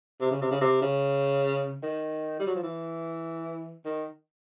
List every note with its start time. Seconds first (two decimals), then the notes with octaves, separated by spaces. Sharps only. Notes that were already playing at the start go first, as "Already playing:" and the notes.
0.21 C3
0.31 C#3
0.42 C3
0.51 C#3
0.61 C3
0.82 C#3
1.83 D#3
2.39 G3
2.47 F#3
2.56 F3
2.63 E3
3.85 D#3